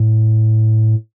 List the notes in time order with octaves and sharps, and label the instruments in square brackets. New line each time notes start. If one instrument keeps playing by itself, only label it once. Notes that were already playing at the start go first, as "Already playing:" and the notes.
Already playing: [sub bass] A2